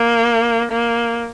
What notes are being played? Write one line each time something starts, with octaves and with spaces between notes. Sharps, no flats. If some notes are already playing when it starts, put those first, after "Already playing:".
Already playing: A#3
A#3